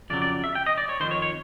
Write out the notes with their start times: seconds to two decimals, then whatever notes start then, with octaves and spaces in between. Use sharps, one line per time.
0.10 F2 C#3 F#3 D5
0.22 D5
0.44 E5
0.55 G5
0.66 D#5
0.78 D5
0.89 C#5
1.00 F2 C3 D#3 C5
1.11 C#5
1.22 C#5